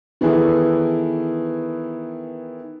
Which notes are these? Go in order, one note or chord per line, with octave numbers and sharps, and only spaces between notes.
D#3 E3 B3 E4 G#4 A4